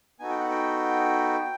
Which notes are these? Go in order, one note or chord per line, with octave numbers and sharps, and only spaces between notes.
B3 D#4 F#4 A4 G#5
G5
F#5
G5